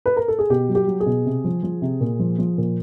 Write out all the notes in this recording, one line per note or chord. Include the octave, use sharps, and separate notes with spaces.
B4
A#4
A4
G#4
B2 G4
F#3
G4
F#3
G#4
B2
C3
F3
F3
C3
A#2
F3
F3
A#2